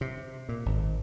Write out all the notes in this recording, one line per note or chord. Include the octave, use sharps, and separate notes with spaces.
C3
A#2
G#1